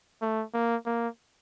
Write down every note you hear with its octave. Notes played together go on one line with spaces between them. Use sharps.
A3
A#3
A#3